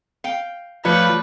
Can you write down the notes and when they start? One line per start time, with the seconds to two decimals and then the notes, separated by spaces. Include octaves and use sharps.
0.24 F5 G5
0.85 F3 G3 A3 B4 C#5